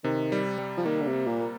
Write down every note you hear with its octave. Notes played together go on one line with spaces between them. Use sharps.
C3 D#3
G3
G3
F3
D#3 A#3
D3
C3
A#3
A#2
A#3